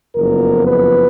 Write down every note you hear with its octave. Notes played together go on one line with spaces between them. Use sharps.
F#1 F2 F3 B3 A#4
B4